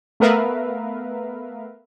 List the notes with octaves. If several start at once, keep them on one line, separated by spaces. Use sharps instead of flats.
A3 B3 A#4 B4 E5 F5